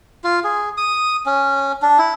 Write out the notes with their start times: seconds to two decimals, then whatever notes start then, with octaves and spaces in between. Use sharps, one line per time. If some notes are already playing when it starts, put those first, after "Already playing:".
0.24 F4
0.44 G#4
0.78 D#6
1.26 C#4
1.82 D4
1.99 E4